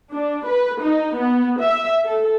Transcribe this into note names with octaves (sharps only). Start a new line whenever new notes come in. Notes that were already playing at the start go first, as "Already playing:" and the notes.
D4
B4
D#4
B3
E5
A4